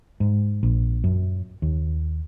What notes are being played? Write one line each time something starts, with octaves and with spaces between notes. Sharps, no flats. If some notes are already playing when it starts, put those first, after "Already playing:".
G#2
A#1
F#2
D#2